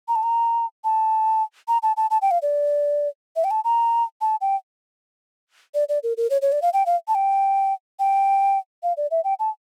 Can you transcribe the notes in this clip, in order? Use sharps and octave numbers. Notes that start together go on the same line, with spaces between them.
A#5
A5
A#5
A5
A#5
A5
A5
A5
G5
F5
D5
E5
G5
A5
A#5
A5
G5
D5
D5
A#4
A#4
C#5
C#5
D5
F5
G5
F5
A5
G5
G5
F5
D5
E5
G5
A5